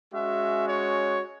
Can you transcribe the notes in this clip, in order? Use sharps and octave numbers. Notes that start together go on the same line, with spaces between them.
G#3 C#4 F#4 E5
C#5